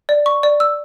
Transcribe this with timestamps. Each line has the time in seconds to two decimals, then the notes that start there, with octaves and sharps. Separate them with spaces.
0.09 D5
0.26 C#6
0.43 D5
0.60 E6